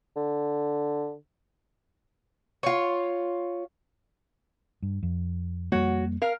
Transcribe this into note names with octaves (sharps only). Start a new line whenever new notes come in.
D3
F4 C#5
G2
F2
F2 G3 A#3 F#4 C#5
A#4 F5